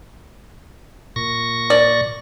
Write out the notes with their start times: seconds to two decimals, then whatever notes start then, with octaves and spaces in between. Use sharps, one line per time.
1.16 A#2 C#6 A#6
1.70 D5